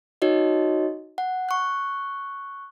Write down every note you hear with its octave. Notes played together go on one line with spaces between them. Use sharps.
D#4 F#4 C#5 D#5
F#5
C#6 F#6